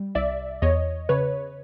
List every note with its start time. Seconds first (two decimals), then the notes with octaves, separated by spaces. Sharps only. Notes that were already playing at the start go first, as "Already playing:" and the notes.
Already playing: G3
0.15 C2 D5 E5
0.62 E2 C#5 D#5
1.09 C#3 B4 C#5